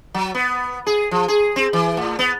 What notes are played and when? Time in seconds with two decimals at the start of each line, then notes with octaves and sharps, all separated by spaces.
0.14 F#3
0.35 B3
0.87 G#4
1.11 F3
1.28 G#4
1.56 C4
1.73 E3
1.97 A2
2.19 B3